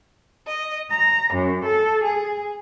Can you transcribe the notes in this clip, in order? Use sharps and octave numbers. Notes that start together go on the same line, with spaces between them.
D#5
A#5
F#2
A4
G#4